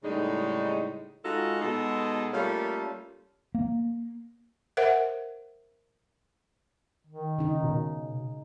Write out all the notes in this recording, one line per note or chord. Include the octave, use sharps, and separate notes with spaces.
A2 C#3 G3 G#3 D#4
G#3 D#4 F4 F#4 G#4 A4
B2 G#3 D#4 G#4 A4
G3 A3 A#3 C#4 F4 A4
A#3
A#4 C5 E5 F#5
D#3
C#3 D#4
B2